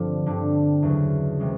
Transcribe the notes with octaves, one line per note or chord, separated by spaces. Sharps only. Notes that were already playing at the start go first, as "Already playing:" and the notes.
Already playing: G2 D3 F3 C4
G2 D3 G3
E2 C#3 F#3
C3 E3 G#3 C#4